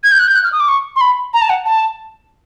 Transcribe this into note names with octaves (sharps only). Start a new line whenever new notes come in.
G#6
G6
F#6
G6
F#6
F6
D#6
D6
C#6
C6
B5
A#5
A5
F#5
A5